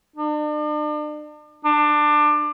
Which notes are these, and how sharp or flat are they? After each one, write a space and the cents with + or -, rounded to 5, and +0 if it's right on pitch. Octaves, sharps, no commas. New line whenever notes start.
D4 +40
D4 +20